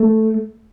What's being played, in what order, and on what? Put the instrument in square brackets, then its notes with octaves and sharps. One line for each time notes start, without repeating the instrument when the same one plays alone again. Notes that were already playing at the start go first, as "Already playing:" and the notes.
Already playing: [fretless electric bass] A3